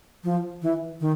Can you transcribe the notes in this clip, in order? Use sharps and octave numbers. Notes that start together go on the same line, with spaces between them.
F3
E3
D#3